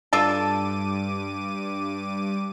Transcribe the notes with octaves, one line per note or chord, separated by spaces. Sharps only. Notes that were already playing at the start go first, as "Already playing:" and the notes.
G2 D4 F4 A4 D6 D#7